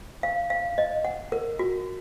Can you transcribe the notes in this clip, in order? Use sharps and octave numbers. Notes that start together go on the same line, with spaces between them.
F5
F5
D#5
F#5
A#4
F#4